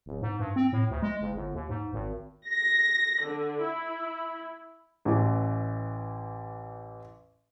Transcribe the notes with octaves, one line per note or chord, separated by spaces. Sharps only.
D1
G#2
G2
C4
A2
D2
G#3
F#1
G1
D#2
G#2
G#1
A#6
D3
E4
A1 E3